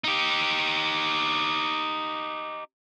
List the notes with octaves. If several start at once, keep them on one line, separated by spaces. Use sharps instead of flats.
D#4 G4